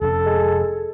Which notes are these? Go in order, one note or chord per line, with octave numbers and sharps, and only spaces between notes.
F1 F2 C#4 A4
G#3